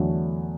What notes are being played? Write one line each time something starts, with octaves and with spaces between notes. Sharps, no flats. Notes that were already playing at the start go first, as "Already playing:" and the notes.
Already playing: E2 D3 F#3 A3